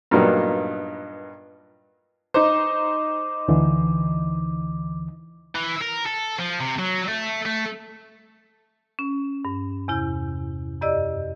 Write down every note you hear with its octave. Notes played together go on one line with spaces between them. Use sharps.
G2 A#2 F#3 A#3 B3 D#4
D#4 C5 D6
D2 D3 E3
E3
A#4
A4
F3
C3
F#3
A3
A3
C#4
G2
E2 C3 E4 G6
F#2 G4 D5 D#5 E6